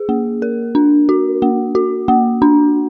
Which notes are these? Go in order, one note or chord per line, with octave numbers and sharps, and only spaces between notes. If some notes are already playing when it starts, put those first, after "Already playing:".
Already playing: G#4
A#3
A#4
D4
F#4
A#3
F#4
A#3
D4